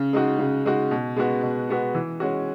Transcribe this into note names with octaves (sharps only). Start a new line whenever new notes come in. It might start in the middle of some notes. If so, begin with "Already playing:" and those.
Already playing: C#3
G#3 D#4 F#4
C#3
G#3 D#4 F#4
B2
G#3 B3 F#4
B2
G#3 B3 F#4
E3
G#3 C#4 F#4